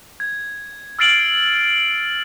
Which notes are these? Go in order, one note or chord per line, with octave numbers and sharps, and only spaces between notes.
G#6
E6 F6 A6 C7 D7 F#7